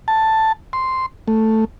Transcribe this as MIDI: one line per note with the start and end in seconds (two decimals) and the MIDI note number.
0.08 0.52 81
0.73 1.06 84
1.28 1.65 57